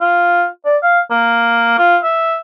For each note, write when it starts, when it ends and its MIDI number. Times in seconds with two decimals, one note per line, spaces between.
0.01 0.46 65
0.65 0.77 74
0.83 1.00 77
1.11 1.77 58
1.78 1.98 65
2.03 2.38 76